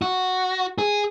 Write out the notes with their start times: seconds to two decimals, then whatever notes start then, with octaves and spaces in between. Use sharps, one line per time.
0.02 F#4
0.78 G#4